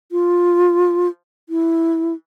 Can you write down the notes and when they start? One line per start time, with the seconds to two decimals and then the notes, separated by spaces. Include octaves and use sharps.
0.12 F4
1.49 E4